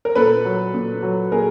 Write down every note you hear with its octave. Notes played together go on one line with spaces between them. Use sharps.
A#4
A#2 A4 B4
F#3
A#2
F#3
A#2 G#4 A#4